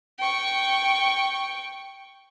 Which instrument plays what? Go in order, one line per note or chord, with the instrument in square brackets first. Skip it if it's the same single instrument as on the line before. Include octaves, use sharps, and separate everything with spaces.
[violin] G5 C#6